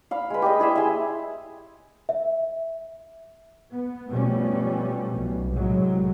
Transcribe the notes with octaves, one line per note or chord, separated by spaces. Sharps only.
F5 B5
G#3 B4
G4 B4 D#5
E4 G#4 D#5 E5
E5 G#5 C6
E5
B3
B2 F3 G3 A3 C#4
B1
C2 A2 F#3 G#3